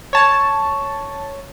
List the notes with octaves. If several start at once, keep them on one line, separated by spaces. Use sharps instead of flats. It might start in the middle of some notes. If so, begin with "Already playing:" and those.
C#5 A5